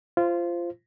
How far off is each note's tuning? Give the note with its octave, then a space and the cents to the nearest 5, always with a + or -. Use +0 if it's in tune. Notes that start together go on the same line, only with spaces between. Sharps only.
F4 -20 C5 +0